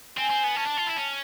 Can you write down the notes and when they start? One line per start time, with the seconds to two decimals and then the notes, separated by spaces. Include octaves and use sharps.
0.17 C4 G#5
0.30 C4
0.44 B3
0.56 C#4 A5
0.66 D4
0.77 F4
0.87 E4
0.97 C#4